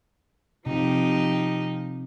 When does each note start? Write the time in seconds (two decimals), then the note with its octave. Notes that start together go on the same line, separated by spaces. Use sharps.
0.66 C3 F3 D#4 G4